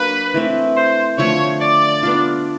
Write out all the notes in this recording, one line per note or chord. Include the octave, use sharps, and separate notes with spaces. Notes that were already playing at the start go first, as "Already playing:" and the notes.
Already playing: F#3 A#3 D4 B4
E3 A3 C4
C5
D3 F3 A3 C#5
D5
B3 D4 F4